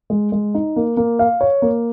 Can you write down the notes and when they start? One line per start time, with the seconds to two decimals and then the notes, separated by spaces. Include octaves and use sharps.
0.10 G#3
0.32 G#3
0.55 D#4
0.76 A#3
0.97 A#3
1.19 F5
1.41 C#5
1.62 A#3